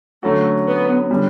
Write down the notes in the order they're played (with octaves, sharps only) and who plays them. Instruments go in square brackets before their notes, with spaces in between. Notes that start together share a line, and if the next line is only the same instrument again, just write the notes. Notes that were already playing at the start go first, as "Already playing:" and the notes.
[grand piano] D3 F#3 C#4 F#4 [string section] A3
[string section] B3
[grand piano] D3 G3 C#4